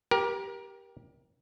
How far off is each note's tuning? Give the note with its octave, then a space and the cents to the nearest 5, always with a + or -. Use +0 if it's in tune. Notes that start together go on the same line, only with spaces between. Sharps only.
G4 +0 A#4 +25